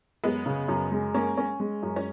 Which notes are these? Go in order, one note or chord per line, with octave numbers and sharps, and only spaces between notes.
F#2 G#3 B3
C#3
F#2
G#3
A#3 C#4
C#4
G#3
F#2
C#4